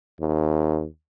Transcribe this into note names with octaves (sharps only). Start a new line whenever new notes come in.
D#2